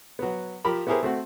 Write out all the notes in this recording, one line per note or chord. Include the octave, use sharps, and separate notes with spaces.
F#3 B3
F3 G4 A#4 B5
B3 E4 G4 G#4 A#4 C5
A3 C4 F#4